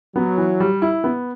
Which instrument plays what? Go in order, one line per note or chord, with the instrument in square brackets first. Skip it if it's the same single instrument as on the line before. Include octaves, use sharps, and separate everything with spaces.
[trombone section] F#3 [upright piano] B3
[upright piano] E3
G3
E4
B3